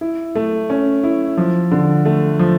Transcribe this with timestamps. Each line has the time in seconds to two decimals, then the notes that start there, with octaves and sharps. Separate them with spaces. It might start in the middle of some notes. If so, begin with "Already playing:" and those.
0.01 E4
0.35 A3
0.70 C#4
1.04 E4
1.37 F3
1.72 D3
2.05 A3
2.39 F3